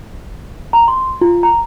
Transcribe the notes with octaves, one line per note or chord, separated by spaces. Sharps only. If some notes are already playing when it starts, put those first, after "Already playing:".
A#5
C6
F4
A#5